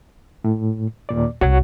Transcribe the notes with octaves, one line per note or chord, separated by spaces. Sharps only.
A2
D#2 A#2 D5
C2 F#4 C#5 F#5